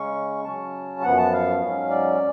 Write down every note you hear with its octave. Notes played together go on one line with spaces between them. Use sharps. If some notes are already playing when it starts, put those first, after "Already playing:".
Already playing: C#3 G#3 C#4 C#6
C#3 F#3 C#4 A5
F#2 F3 B3 F#5
A5
F5
G#2 F#3 C#4
D5